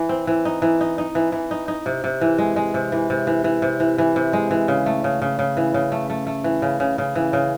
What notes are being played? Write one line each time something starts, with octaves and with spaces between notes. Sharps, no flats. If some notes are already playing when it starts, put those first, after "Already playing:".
Already playing: E3
C4
E3
D#4
E3
D#4
D#4
E3
E3
D#4
D#4
C3
C3
E3
G#3
G#3
C3
E3
C3
E3
E3
C3
E3
E3
C3
G#3
E3
C#3
A3
C#3
C#3
C#3
E3
C#3
A3
A3
A3
E3
C#3
C#3
C#3
E3
C#3